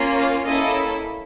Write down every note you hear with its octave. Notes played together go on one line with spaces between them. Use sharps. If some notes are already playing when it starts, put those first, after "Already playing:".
Already playing: A#3 C#4 F4
F5
A#3 C#4 E4 A4 D#5